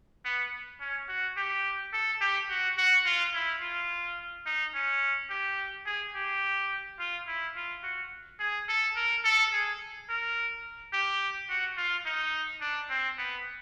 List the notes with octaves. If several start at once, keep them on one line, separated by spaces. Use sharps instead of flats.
B3
C#4
F#4
G4
A4
G4
F#4
F#4
F4
E4
F4
D#4
C#4
G4
G#4
G4
F4
E4
F4
F#4
G#4
A4
A#4
A4
G#4
A#4
G4
F#4
F4
D#4
D4
C4
B3